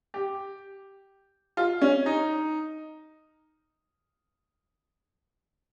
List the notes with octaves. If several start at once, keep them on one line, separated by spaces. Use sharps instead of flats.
G4
F4
C#4
D#4